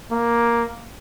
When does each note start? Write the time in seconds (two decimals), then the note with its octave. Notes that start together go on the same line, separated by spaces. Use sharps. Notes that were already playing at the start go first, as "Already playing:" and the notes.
0.12 A#3